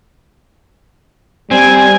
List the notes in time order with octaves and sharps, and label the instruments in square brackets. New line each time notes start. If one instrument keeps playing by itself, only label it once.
[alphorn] G3 [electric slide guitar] C4 [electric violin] G#5 G#6